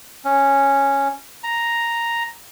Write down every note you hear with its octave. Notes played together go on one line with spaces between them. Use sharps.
C#4
A#5